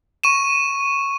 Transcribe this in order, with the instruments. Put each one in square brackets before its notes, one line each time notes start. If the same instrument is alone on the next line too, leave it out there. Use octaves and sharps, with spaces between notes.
[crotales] C#6 D#7 E7